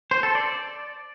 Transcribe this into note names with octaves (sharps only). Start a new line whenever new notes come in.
C5
A4
D5